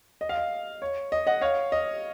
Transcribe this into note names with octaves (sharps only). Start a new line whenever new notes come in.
D#5
F5
D#5
C#5
D#5
D#5 F#5
C#5 F5
D#5